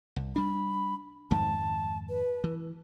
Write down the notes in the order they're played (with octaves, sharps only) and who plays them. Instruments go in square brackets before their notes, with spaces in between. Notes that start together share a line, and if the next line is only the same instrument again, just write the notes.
[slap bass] C2
[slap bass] G3 D4 [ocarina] B5
[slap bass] F2 G#2 D#3 [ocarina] A5
[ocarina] B4
[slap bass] E3